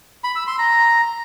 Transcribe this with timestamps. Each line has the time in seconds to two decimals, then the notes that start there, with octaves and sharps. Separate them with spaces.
0.24 B5
0.36 E6
0.47 C6
0.59 A#5